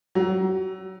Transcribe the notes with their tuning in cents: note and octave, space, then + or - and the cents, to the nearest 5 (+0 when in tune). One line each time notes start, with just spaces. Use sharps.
F#3 +30